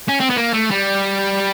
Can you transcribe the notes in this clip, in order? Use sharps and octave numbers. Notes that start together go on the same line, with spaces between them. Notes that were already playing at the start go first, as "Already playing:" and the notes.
C#4
C4
B3
A#3
A3
G3